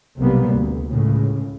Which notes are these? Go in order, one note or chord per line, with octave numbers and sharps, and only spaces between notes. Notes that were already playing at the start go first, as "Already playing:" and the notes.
B1 C3 G3 A#3 B3
D2
C#2 A2 C#3